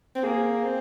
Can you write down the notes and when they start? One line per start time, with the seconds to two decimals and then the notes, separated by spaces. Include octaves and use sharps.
0.15 C4
0.23 A#3 G#4
0.64 C4